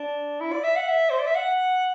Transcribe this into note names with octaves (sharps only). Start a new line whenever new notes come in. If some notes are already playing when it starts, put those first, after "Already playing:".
Already playing: D4
E4
D5
E5
F#5
E5
C5
D5
E5
F#5